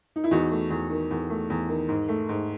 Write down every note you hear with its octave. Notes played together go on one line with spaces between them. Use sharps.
D#4
E4
E2 D#4 F#4
A3
E2
D#3
E2
A3
E2
D#3
G#2
A3
G#2